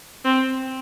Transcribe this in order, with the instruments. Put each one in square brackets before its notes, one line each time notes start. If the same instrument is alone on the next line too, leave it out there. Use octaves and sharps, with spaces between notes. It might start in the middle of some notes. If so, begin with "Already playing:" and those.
[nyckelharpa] C4